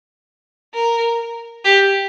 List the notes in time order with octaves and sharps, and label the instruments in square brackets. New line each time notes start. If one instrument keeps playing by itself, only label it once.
[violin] A#4
G4